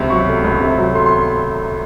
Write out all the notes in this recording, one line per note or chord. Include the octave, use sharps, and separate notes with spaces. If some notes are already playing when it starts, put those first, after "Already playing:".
Already playing: C#2 C3
F#3 C#6
A3
C#2
C3
F#3
A3 C6
C6